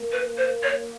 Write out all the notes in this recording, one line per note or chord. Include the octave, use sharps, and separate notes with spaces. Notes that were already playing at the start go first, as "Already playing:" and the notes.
Already playing: A#3
B4
C5
C#5